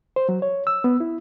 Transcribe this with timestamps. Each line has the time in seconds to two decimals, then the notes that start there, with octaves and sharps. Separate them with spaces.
0.16 C5
0.29 F#3
0.42 C#5
0.67 E6
0.84 B3
1.00 E4